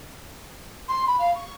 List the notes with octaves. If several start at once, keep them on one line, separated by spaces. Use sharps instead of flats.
C6
B5
F5
C#6